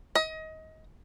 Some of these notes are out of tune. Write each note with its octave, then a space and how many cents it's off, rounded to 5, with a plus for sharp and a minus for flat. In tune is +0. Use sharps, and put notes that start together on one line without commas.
D#5 +25